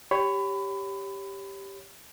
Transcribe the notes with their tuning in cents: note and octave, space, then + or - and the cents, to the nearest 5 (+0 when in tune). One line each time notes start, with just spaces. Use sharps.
G4 +0 C#5 +0 B5 +25